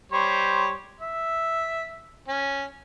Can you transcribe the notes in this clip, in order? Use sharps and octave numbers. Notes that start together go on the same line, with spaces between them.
G3 C5 C#5
E5
C#4